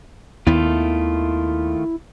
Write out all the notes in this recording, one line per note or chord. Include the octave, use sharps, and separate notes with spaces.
D#2 D#3 A3 B3 E4 F4